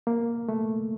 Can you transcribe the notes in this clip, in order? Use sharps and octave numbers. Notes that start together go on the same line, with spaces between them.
A#3
A3